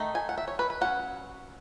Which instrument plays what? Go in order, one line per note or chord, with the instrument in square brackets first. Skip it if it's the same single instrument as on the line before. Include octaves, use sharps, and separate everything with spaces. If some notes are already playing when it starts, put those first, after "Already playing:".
Already playing: [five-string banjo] D#3 A3 D#4
G#5
F#5
E5
C#5
B4
B4
F#3 C#4 F#5